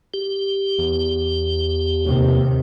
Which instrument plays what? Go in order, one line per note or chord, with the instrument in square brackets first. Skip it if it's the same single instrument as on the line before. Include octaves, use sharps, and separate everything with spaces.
[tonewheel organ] G4
[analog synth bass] E2
[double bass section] D#2 C3 D#3